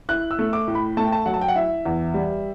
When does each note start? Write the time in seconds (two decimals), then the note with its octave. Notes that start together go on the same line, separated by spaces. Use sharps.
0.09 E4 F#6
0.31 E6
0.39 A3
0.53 D6
0.68 A2
0.75 B5
0.97 A3 A5
1.05 G5
1.12 A5
1.26 F#3 F#5
1.34 A5
1.41 G5
1.48 F#5
1.56 E4 E5
1.86 E2
2.14 G3